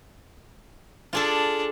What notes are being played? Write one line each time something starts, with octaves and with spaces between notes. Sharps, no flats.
D4 F4 G#4 A4